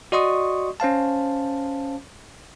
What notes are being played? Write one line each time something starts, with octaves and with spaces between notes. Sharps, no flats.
F#4 D5 D#5 C6 C#6 D#6
C#4 C5 F5 A5